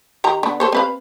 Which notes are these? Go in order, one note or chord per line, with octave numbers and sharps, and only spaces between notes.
D#3 G4 A#5
D3 B3
A4 C5 C#5
C4 B4 F5